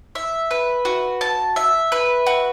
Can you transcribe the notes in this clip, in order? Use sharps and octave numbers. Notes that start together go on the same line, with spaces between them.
E5
B4
F#4
A5
E5
B4
F#4